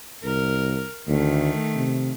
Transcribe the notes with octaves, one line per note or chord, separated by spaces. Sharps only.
C2 A#4
D2 D#3 A3
C3